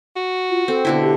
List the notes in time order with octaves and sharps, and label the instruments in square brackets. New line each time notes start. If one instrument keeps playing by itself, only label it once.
[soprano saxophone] F#4
[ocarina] F4
[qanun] C4 [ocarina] A4
[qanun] B2 D3 E4
[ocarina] G4